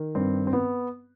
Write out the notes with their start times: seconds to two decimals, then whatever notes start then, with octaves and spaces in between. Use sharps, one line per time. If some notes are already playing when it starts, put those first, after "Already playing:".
Already playing: D#3
0.15 G2 C4
0.47 C4
0.53 B3